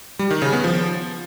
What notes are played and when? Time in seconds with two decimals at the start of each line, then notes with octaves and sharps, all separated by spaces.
0.19 G3
0.31 D#3
0.42 C#3
0.53 B3
0.64 F3